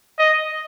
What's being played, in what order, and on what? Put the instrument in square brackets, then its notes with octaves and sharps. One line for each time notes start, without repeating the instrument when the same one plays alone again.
[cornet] D#5